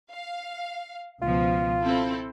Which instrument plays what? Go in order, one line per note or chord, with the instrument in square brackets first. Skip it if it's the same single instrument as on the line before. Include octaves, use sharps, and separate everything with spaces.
[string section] F5
[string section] C#2 B2 F3 [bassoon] F4
[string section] C4 E4 A4